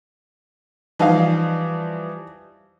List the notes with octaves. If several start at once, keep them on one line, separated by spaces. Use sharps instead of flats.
E3 F3 G3 D#4 F5